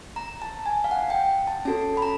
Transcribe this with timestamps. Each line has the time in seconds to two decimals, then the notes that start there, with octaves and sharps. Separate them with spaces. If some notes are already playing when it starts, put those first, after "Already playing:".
0.16 A#5
0.42 A5
0.66 G#5
0.84 F5
0.91 F#5
1.10 G5
1.47 A5
1.65 C#4 F#4 A4 A5
1.97 B5
2.02 A#5